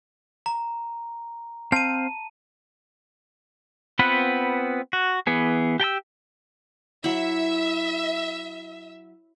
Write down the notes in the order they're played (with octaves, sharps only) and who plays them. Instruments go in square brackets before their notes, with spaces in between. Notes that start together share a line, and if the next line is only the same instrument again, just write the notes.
[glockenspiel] A#5
[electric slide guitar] C4 C5 F5 [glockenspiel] A5 D#7
[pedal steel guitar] B3 C4 F4 B4 F#5
F#4
E3 B3 G#4
G4 G5 A5 E6
[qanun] F#3 E4 [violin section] E5